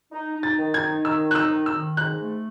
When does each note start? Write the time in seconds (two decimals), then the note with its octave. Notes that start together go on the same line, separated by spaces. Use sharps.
0.12 D#4
0.35 D#4
0.43 A6
0.58 D#3
0.74 G#6
0.82 D#4
1.05 D#3 E6
1.28 D#4 F#6
1.35 E6
1.51 D#3
1.66 E6
1.74 D#3
1.97 G#2 F#6
2.20 A3